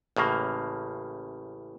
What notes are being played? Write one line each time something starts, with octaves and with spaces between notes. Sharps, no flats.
A1 A2 C#3 A#3